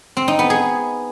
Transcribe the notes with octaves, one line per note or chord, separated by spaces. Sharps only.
C4
D#4
B3
G#4